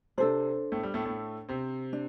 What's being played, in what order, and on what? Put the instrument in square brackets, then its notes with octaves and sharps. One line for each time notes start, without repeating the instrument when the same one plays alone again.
[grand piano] C3 C4 [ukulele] D4 A4 C5
[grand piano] A2 A3
G3
A2 A3
A2 A3
C3 C4
[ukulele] D4